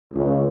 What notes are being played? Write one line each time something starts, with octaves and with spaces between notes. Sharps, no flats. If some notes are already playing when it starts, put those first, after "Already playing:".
C#2